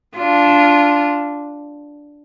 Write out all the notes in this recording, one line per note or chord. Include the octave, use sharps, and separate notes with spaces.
D4 F4